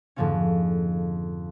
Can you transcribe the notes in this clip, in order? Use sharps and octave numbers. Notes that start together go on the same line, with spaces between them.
F2 G#2 D3 F3 A#3 C#4